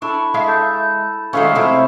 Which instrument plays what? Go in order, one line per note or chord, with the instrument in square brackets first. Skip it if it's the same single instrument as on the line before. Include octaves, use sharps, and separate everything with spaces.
[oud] D4 [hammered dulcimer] E4 A4 [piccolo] C#6
[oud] G#3 E5 F5
[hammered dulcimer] A4 [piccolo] G6
[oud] D#3 E3 A3 [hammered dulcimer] F#3 G#3 C#4 [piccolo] F5
[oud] C3 F3 A3 [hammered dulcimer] E4